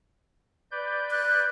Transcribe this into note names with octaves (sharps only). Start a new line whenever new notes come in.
B4 D5 G6
F#6